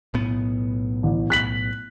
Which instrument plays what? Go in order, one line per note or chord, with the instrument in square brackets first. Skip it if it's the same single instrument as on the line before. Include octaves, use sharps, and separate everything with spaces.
[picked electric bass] B1 A2 B3
[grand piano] A1
F#6 B6 F#7